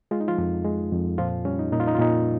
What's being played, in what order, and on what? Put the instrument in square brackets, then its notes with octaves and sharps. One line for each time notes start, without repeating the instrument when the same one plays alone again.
[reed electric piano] G#3 F4
D#4
F3 F4
F2
G#3
F2
A#2 F3 F4
G3 C#4
D#4
A#2 D#4
F4
D#4
F4
A#2 D#4